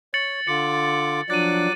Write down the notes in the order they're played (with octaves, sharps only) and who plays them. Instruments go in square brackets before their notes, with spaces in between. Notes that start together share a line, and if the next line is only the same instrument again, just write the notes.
[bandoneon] C#5 [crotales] A6 C#7 F#7
[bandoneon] D3 F4 D6 [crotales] C#7
[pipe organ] F3 D4 [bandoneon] F#3 D6 F#6 [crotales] A6 D#7